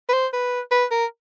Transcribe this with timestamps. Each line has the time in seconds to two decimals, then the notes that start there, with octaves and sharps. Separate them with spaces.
0.09 B4
0.13 C5
0.33 B4
0.71 B4
0.91 A#4